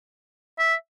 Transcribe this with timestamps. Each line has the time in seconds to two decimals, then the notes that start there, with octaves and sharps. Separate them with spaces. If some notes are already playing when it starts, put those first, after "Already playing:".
0.59 E5